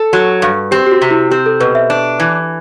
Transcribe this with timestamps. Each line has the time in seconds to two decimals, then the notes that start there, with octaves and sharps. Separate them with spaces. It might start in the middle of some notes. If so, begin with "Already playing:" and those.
Already playing: A4
0.13 F#3 F#4
0.42 G2
0.71 C4 G4
0.87 G4
0.91 F#4
1.02 C3
1.11 E4
1.31 C4 G4
1.46 A4
1.60 B2 B4
1.75 E5
1.90 D4
2.20 E3